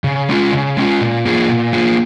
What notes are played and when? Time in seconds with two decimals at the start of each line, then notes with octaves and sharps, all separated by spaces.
0.04 C#3
0.29 G#3 C#4 F4
0.52 C#3
0.77 G#3 C#4 F4
1.01 A#2
1.25 A#3 F4 G#4
1.49 A#2
1.73 A#3 F4 G#4